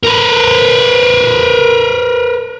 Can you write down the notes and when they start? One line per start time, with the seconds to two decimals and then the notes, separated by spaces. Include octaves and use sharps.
0.03 A#4 B4